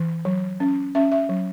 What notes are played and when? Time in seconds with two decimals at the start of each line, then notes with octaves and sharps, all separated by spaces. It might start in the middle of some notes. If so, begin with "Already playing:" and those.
Already playing: E3
0.25 F#3
0.60 C#4
0.95 C#4 E5
1.12 E5
1.29 F#3